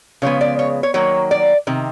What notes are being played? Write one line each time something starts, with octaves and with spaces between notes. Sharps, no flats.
C#3 F3 G#3 B3 C#5
D5
C#5
C#5
D#3 F#3 A#3 C#5
D5
C3 D#3